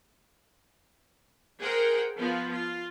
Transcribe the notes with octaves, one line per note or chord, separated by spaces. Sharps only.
G#4 A#4 C5 F#5 G5
F3 B3 F4
F4